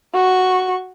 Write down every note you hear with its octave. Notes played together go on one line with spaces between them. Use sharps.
F#4 C#6